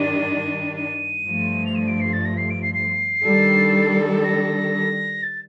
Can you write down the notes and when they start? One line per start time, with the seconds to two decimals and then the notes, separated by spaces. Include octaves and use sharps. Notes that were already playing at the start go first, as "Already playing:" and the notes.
Already playing: G2 D#3 G3 D4 D#7
0.76 D#7
1.25 G2 F3 A3
1.66 F7
1.75 D#7
1.88 D7
2.00 C7
2.13 A6
2.25 A#6
2.37 C7
2.50 D7
2.62 C7
2.74 C7
3.24 D#3 G3 D4 A4
4.24 A#6
5.23 A6